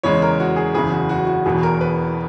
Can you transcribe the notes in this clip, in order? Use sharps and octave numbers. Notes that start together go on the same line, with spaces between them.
E2 C#3 G#3 C#5
A#4
F#4
G#4
F#1 E2 C#3 G#4
F#4
F#4
F#4
E1 E2 B2 F#3 G#4
A#4
B4